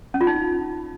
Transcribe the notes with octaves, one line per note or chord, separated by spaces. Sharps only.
C#4
F4
D#4